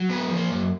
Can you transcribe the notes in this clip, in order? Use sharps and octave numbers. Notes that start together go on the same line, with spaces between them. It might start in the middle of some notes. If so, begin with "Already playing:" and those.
Already playing: F#3
G#3 B3 B4
F3
A#3 A#4
F#2